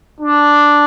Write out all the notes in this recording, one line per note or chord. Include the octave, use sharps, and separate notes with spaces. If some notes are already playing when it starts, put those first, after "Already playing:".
D4